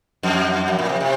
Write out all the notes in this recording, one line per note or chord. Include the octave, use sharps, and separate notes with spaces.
F2
F#2
A#2
C3
C3